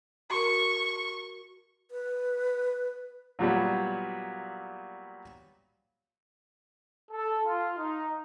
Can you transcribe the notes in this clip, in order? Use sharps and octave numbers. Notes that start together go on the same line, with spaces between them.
F#4 A#4 C#6
B4
A#2 F#3 G3 B3
A4
F4
D#4